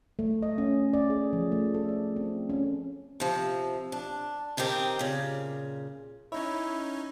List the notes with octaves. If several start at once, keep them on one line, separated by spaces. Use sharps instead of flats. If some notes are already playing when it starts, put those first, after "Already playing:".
A3
D#5
C#4
D5
G#4
F3
A3
A4
D5
C4
C#4
C3 F3
D4
D#3 C4 D#4 G4 G#4 A#4
A#2 C#3
C#4 D#4 E4 C#5